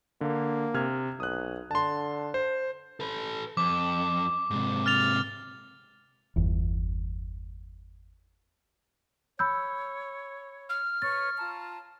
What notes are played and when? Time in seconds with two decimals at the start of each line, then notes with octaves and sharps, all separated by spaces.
0.21 D3 A#3
0.74 C3 F6 G#6
1.20 B1 D#6 F#6
1.71 D3 A5 C6
2.34 C5
3.00 A4 B4
3.57 F2 D6
4.51 G#2 C3
4.86 F6 A6 F7
6.36 G1 E2
9.39 C#5 B5 E6 G6
10.69 F6
11.02 B4 C#5 C#6 A6
11.39 F4 A5 A#5